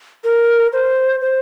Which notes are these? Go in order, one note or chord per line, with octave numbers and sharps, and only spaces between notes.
A#4
C5
C5